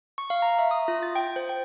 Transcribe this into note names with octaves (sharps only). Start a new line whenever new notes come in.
C#6
F5
A#5
E5
D#6
F4
A6
G5
C5
G5